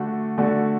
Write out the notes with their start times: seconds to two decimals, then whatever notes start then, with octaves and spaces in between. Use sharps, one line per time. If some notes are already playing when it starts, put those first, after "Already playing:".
Already playing: D3 A3 D4 F#4
0.38 D3 A3 D4 F#4